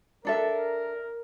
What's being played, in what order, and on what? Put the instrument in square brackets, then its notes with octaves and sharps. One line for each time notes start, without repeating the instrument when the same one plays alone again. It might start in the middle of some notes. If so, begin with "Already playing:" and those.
[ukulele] D4 A4 E5 [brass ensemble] A#4